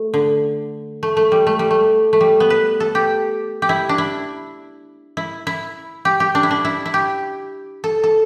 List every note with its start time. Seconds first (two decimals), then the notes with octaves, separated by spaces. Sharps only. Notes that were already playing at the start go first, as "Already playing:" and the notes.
Already playing: A3
0.14 D3
1.03 A3
1.17 A3
1.32 G3
1.47 A3
1.59 G3
1.71 A3
2.13 A3
2.21 G3
2.40 B3
2.50 B4
2.80 A4
2.95 G4
3.62 G4
3.69 E4
3.89 D4
3.98 E4
5.17 E4
5.47 E4
6.05 G4
6.20 G4
6.35 D4
6.43 E4
6.51 D4
6.65 E4
6.86 E4
6.94 G4
7.84 A4
8.04 A4